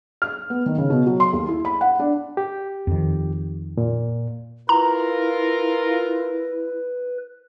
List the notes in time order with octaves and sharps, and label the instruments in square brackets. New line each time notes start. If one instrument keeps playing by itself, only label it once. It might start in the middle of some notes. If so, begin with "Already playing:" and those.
[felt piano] F6
B3
D#3
C#3
B2
F#3
C6
D#2
E4
B5
F#5
D4
[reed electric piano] G4
[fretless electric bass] F2 D#3
[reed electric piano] A#2
[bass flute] E4 [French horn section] F4 A#4 [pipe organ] B4 [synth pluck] A#5